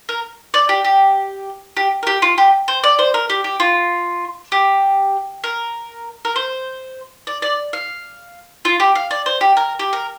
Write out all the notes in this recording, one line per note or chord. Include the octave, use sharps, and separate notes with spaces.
A#4
D5
G4
G4
G4
A#4
G4
F4
G4
C5
D5
C5
A#4
G4
G4
F4
G4
A#4
A#4
C5
D5
D5
F5
F4
G4
F5
D5
C5
G4
A#4
G4
A#4